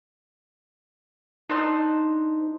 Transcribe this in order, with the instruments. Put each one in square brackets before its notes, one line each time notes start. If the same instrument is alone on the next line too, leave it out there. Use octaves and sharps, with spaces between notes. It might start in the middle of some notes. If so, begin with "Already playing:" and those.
[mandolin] D4 C5 E6 [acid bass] D#4